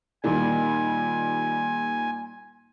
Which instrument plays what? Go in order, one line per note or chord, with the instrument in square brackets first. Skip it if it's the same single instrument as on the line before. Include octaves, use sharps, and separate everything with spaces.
[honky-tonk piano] A#2 D#3 G3 [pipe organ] G#5